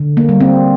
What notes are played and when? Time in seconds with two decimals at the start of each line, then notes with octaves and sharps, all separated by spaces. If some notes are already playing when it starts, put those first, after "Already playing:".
Already playing: D3
0.17 A#3
0.29 G3
0.41 C4